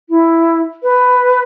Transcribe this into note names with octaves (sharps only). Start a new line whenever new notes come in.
E4
B4